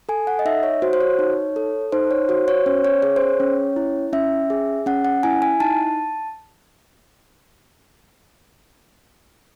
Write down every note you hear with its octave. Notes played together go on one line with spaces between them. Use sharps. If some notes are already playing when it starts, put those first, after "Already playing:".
A4 G#5
F#5
D#5
D#4 E5
C#5
F#4 C5
C5
C#5
D#4
A4
D#4 C5
C#5
F#4 C5
C#5
C#4 C5
C#5
G#4 C#5
C5
C#5
C#4
E4
C#4 E5
G#4
C#4 F#5
F#5
E4 G#5
G#5
D#4 A5